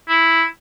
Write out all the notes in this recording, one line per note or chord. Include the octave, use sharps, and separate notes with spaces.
E4